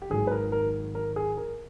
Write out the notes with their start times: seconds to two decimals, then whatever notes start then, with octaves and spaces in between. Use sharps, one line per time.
0.02 G4
0.10 G#1 G#2 D#3 F#3 G#4
0.27 B4
0.31 A#4
0.52 A#4
0.95 A#4
1.16 G#4
1.37 A#4